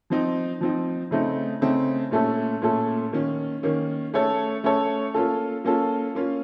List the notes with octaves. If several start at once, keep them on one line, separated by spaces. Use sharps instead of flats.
F3 C4 D#4
F3 C4 D#4
C#3 A3 C4 D#4
C#3 A3 C4 D#4
A#2 A3 C#4 A4
A#2 A3 C#4 A4
D#3 A#3 C#4
D#3 A#3 C#4
A3 C#4 A4 C#5
A3 C#4 A4 C#5
A#3 C#4 F4 A4
A#3 C#4 F4 A4
A#3 C#4 F4